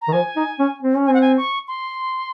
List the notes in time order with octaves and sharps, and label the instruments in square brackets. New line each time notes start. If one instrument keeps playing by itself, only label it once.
[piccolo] A#5
[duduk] D#3
[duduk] F3 [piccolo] G#5
[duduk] D#4
C#4
C4
C#4
[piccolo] G#5
[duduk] C4 [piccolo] F#5
[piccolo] G#5
C#6
C6